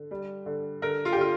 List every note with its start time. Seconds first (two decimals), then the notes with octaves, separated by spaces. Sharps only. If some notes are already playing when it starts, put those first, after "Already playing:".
Already playing: D3
0.11 G3
0.46 D3
0.82 D3 A#4
1.05 F4
1.13 G4
1.17 D3 F4